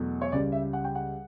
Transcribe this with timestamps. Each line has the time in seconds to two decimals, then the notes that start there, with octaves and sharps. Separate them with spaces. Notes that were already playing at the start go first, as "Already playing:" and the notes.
Already playing: E2 B2 F#3 A3
0.21 C#5
0.32 C#2 C#3 G3 D5
0.52 E5
0.73 F#5
0.84 G5
0.95 F#5